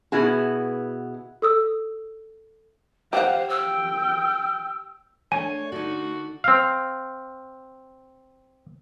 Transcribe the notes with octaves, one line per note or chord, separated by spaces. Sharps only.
B2 B3 E4 F#4 G#4
A4 D#6 E6
G4 C5 F5 F#5
G5 E6
A3 D4 C#5 G#5
D3 D#4 F#4
C4 F5